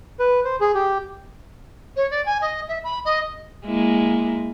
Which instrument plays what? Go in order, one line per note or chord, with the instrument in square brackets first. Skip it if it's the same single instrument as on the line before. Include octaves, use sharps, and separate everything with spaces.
[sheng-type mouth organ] B4
C5
G#4
G4
[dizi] C#5
D5
G#5
D#5
E5
B5
D#5
[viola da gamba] G#3 A#3 E4